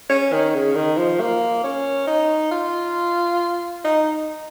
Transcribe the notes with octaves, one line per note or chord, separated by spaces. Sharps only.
C#4
D#3
C#3
D#3
F3
A#3
C#4
D#4
F4
D#4